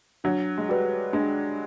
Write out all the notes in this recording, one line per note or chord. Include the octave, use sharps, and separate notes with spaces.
F#3 D4
G#3
G3 F#4 B4
G#3 D4